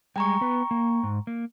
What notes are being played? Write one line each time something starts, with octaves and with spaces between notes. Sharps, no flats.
G3 G#3 G5 G#5 A#5 C#6
B3 B4
A#3
G#2
A#3